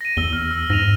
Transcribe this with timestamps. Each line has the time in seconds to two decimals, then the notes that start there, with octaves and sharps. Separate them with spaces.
0.01 A#6 D#7
0.17 E2 E6 G7
0.33 E6 F6
0.51 E6
0.70 G#2 A#6 D#7 F7